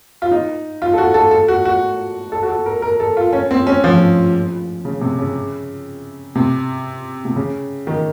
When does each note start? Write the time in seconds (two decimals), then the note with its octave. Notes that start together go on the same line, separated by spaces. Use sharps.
0.22 F4
0.31 D#4
0.82 F4
0.93 A4
0.98 F#4
1.14 A4
1.31 A4
1.48 F#4
1.65 F#4
2.32 A4
2.43 F#4
2.49 A4
2.66 A#4
2.82 A#4
3.00 A4
3.17 F4
3.33 C#4
3.51 C4
3.67 C#4
3.84 F3
4.85 C#3
5.01 C3
5.19 C#3
6.35 C3
7.25 C3
7.36 C#3
7.87 D#3